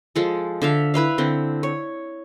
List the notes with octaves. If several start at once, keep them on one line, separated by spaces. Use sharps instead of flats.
F3 G#3 A4
D3 E5 F5
E4 B4 E5 F5
D3 C4
C#5